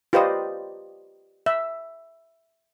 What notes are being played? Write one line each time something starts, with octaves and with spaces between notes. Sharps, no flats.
F4 G4 B4 C5 D5 D#5
E5